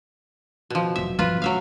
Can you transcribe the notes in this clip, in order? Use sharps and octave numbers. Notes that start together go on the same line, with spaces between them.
B2 F3
F1 F#3 E5
G2 F3 F4 B4
F#3 A3 C#4 E5 F5